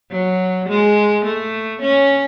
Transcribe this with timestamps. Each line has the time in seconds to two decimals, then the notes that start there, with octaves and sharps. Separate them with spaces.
0.11 F#3
0.69 G#3
1.25 A3
1.82 C#4